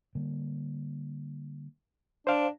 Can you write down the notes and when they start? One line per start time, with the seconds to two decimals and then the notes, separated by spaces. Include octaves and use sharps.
0.15 D3 G3 A#3
2.27 D4 C5 F5